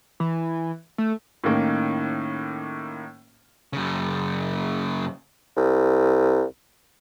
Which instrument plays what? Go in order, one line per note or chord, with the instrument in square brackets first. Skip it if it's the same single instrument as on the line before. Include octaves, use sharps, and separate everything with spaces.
[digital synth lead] E3
A3
[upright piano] A2 D#3 A#3 C#4
[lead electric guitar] F#2 C#3
[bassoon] C2